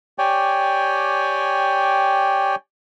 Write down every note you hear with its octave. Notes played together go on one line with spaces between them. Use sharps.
G4 C#5 D5 G5 G#5